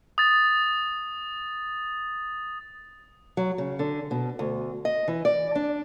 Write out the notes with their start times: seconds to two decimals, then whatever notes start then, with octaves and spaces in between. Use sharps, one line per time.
0.18 D#6 A6
3.37 F#3
3.58 C#3
3.79 D3
4.11 B2
4.39 D2
4.85 D#5
5.08 E3
5.25 D5
5.55 D4